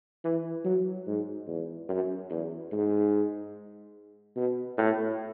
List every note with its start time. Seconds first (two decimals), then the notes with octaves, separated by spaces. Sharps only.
0.24 E3
0.65 F#3
1.07 G#2
1.48 E2
1.89 F#2
2.30 E2
2.72 G#2
4.36 B2
4.78 A2